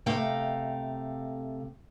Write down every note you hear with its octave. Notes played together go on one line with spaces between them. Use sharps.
C3 A3 F5 G5 A#5